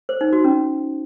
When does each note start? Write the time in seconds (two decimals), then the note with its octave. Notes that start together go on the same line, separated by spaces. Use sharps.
0.09 C5
0.21 D#4
0.33 F#4
0.44 C#4